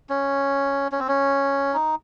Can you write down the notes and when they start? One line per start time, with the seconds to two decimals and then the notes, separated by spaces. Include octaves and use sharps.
0.09 C#4
0.92 C#4
0.99 C4
1.08 C#4
1.74 D#4